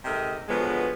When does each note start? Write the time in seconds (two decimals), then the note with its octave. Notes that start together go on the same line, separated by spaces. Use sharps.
0.04 G#2 C3 A4 A#4 D#5
0.49 B2 D3 F3 F#3 G#3 B3